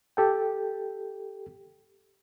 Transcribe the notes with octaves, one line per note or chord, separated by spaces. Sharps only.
G4 A4 G5